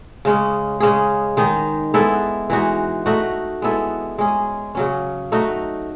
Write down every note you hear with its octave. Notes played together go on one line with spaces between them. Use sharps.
C#3 G#3 C#4
C#3 G#3 C#4 G#4
D#3 G#3 D#4
G#3 B3 E4 A4
E3 G#3 D#4 F#4
A3 D#4 F#4
G#3 B3 E4 A4
G#3 C#4 G#4
C#3 F#3 C#4
A3 D#4 F#4